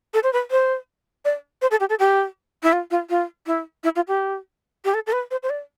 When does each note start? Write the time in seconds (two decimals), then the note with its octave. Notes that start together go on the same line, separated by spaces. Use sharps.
0.14 A4
0.23 C5
0.33 B4
0.51 C5
1.25 D5
1.62 C5
1.71 A4
1.80 G4
1.90 A4
1.99 G4
2.63 E4
2.73 F4
2.91 F4
3.10 F4
3.47 E4
3.84 E4
3.96 F4
4.08 G4
4.85 G4
4.94 A4
5.07 A4
5.13 B4
5.31 C5
5.43 C5
5.50 D5